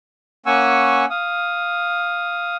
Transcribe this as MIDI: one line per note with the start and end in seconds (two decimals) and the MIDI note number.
0.46 1.05 58
0.46 1.05 61
0.46 1.05 78
0.46 1.05 80
0.46 1.05 85
0.46 1.05 88
1.10 2.57 77
1.10 2.57 87